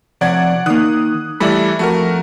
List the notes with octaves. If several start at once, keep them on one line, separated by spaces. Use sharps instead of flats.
C3 F3 C#5 D5 F#5 G#6
D#3 A#3 D#6 F#6
E3 G3 A3 D5 E5 B5
F2 A3 F#4 A#4